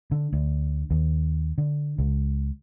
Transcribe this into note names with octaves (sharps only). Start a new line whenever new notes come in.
D3
D2
D#2
D3
C#2